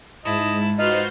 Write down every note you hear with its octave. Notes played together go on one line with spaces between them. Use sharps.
G#2 E4 D#5 A5
D#4 F4 F#4 B4 C5 F6 G6